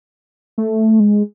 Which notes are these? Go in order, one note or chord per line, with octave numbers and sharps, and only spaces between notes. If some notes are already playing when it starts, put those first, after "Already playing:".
A3
G#3